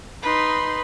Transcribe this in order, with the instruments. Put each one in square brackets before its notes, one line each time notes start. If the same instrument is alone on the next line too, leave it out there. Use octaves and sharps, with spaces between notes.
[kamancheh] D#4 C6 [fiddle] B4